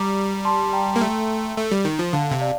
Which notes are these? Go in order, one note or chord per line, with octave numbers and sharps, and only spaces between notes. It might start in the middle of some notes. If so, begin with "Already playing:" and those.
Already playing: G3 A#5 D6
A5 C6
G5 A#5
A#3
A3
A3
G3
D#3
F3
D3 F5 A5
C3
D5 F5